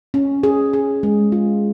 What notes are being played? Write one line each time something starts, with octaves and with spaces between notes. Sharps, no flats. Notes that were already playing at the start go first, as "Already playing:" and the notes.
C#4
G#4
G#4
G#3
F4